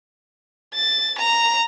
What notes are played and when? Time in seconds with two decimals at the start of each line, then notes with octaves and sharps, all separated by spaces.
0.74 A6
1.19 A#5